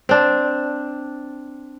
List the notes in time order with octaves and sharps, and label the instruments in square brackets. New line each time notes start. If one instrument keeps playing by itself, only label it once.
[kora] C4 D4